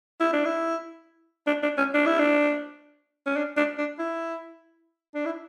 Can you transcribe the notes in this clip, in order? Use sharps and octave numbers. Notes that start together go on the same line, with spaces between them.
E4
D4
E4
D4
D4
C#4
D4
E4
D4
C#4
D4
D4
D4
E4
D4
E4